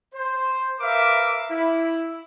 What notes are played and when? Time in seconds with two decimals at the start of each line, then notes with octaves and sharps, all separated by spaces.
0.13 C5
0.80 A#4 B4 E5 F5 D6
1.49 E4